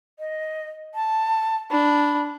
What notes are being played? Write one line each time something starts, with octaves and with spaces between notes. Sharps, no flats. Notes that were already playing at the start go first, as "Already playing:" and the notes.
D#5
A5
D4 B5